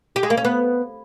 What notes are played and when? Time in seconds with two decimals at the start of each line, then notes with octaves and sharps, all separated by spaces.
0.16 G4
0.23 G#3
0.30 A#3
0.37 C#4
0.45 B3